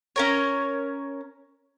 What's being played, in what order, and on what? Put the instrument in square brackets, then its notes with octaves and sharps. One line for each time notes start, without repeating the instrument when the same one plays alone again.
[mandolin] C#4 A#4 C#5